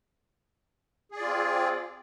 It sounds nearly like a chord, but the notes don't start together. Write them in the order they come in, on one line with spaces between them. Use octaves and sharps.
G#4 D5 F4 C4